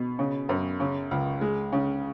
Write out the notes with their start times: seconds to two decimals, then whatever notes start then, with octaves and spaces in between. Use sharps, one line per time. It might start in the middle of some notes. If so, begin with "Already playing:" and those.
Already playing: B2
0.19 C#3
0.49 F#2
0.80 C#3
1.11 C#2
1.41 G#3
1.72 C#3